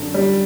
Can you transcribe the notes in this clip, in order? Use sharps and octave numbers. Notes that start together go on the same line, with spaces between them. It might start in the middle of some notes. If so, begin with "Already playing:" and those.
Already playing: F#2 D3
G3